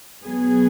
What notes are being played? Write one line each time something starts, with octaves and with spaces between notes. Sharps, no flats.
B2 F#3 B3 G#4